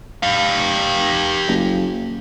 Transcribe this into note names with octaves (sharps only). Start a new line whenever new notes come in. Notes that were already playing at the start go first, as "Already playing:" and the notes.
G4 F5
F#1